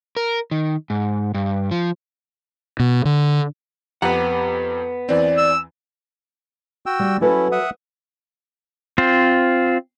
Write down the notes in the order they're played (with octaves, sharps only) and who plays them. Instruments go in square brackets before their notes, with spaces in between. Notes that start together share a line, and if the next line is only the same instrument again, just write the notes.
[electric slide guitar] A#4
D#3
G#2
G2
F3
[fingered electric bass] B2
D3
[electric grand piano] F2 G4 A#5 [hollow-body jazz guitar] B3 F#5
[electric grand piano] E2 E3 C4 [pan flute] D5
[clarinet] E6
[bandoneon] F#4 G5 E6
[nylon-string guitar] G3
[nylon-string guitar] F#3 A4 B4 [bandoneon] C#4 E4
[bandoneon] E5 F#5 D#6
[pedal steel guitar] C4 F4 C5